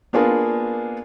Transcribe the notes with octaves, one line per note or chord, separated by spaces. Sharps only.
A#3 B3 D4 F4 G#4 A#4